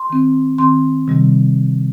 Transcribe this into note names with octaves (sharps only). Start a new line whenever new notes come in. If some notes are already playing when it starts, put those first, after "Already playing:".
Already playing: C6
D#3 C4
D#3 C4 C6
C3 D#3 G3